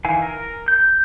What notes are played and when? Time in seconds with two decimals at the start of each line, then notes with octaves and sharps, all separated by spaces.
0.05 D#3 E3 F5 G#5
0.22 A#4
0.68 G6